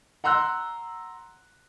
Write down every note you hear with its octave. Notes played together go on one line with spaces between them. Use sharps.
F#5 A#5 C6 E6 F#6